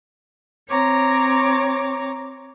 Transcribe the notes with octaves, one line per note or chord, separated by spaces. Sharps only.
C4 C#5 A#5 D6